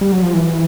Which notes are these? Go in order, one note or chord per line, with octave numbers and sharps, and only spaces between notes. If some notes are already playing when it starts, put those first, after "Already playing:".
G3
F#3
F3
E3